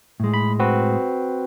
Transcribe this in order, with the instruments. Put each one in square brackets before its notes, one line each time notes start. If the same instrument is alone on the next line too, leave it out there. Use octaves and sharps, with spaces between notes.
[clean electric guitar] A2 G#3
[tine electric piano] B5
C4 F#4 B4